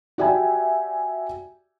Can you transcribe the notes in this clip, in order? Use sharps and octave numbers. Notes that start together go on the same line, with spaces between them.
F#4 G4 D5 E5 G5 G#5